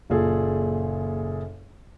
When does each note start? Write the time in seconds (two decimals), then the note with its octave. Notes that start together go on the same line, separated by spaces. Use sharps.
0.10 F#1 A#2 G#4 A4